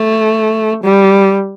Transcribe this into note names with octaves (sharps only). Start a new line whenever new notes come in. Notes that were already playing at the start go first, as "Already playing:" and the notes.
Already playing: A3
G3